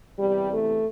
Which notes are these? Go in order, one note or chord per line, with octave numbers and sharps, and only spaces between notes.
E2 C3 E3 G3
A3